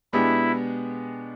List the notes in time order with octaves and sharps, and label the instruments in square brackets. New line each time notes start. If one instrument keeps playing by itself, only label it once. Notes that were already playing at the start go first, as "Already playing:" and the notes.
[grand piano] B2 G#3 B3 D4 G4 [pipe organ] E4